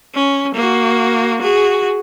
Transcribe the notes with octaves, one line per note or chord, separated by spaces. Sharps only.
C#4
A#3 F#4
F#4 G#4